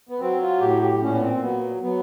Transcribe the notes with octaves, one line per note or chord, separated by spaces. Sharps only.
B3
F#3 C4
F4
A2 G4
G4
A#2 C#4
B3
C4
F#3 B3
F#3 B3